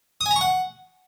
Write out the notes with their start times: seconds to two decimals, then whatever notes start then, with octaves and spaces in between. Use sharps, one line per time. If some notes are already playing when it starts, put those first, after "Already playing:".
0.21 D#6
0.26 G#5
0.31 A#5
0.36 C#6
0.41 F#5